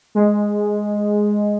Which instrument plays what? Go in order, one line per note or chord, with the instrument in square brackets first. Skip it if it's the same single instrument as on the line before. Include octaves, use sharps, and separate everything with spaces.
[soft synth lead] G#3